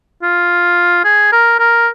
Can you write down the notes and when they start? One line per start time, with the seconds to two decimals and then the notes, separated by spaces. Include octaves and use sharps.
0.22 F4
1.05 G#4
1.32 A#4
1.59 A#4